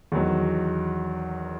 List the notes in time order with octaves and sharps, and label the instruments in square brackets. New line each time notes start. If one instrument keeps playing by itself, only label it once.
[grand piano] E2 D#3 F#3